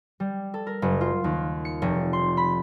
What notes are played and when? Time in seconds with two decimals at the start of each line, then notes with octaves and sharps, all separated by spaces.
0.20 G3
0.54 A4
0.67 A#4
0.82 F#1
1.01 F4
1.24 D#2
1.65 C#7
1.82 F1
2.13 C6
2.37 B5